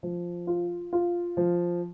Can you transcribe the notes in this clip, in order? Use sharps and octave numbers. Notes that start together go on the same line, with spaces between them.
F3
F4
F4
F3